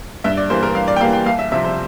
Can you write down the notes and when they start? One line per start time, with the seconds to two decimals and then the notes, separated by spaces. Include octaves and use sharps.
0.24 G2 E5
0.37 D5
0.50 E3 G3 A#3 C5
0.63 A#4
0.75 G2 F5
0.88 D5
0.96 G5
1.01 E3 G3 A#3 F5
1.13 G5
1.26 C2 F5
1.39 E5
1.52 C3 F3 C4 E5
1.65 C5